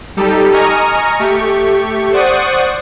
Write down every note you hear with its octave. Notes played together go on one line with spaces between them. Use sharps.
G3 D#4 G4 A4
D#5 G#5 A#5 C#6 D#6 F6
A3 G4 C#6
C5 D5 F#5 C#6 D#6